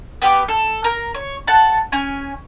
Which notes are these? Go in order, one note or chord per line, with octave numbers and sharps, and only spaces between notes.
B3 G4 D6
A4
A#4
C#5
A4 F#5 A5
C#4 G#5